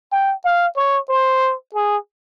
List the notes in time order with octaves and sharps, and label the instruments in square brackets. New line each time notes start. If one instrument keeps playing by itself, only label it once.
[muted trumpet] G5
F5
C#5
C5
G#4